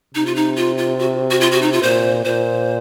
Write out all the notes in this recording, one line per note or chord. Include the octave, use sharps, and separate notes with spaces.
C3 D#4
F4
D#4
F4
F4
F#4
F#4
F4
F#4
D#4
F4
A#2 C5
A#2 C5